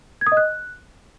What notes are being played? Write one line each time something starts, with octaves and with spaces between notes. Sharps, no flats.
G#6
D#6
D#5
F#6